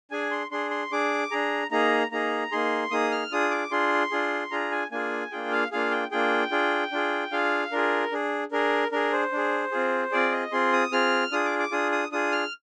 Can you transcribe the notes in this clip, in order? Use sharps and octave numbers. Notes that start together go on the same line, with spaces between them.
D4 G#4 G#5
C6
D4 G#4 C6
C6
D4 G#4 D6
D4 G#4 A#5
A#3 D#4 G#4 A#5
A#3 D#4 G#4 A#5
A#3 D#4 G#4 C6
A#3 D#4 G#4 D#6
F6
D4 F4 G#4 D#6
D6
D4 F4 G#4 C6
D4 F4 G#4
D4 F4 G#4 A#5
G#5
A#3 D4 F4 G#4 G#5
A#3 D4 F4 G#4 G5
F5
A#3 D4 F4 G#4 F5
G5
A#3 D4 F4 G#4 G5
D4 F4 G#4
D4 F4 G#4
D4 F4 G#4 F5
D4 F4 G#4 A#4
D4 G#4
D4 G#4 A#4
D4 G#4 A#4
C5
D4 G#4
C4 F4 G#4
C4 F4 G#4 D5
D#5
C4 F4 G#4 C6
D#6
C4 F4 G#4 F6
D4 F4 G#4 D#6
D6
D6
D4 F4 G#4 D#6
D#6
D4 F4 G#4 D#6
F6